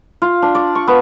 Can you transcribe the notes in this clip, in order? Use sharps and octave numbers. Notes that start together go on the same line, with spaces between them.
F4
D4
D5
C#6
B3